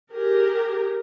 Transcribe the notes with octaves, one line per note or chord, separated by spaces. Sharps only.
G4 G#4 A#4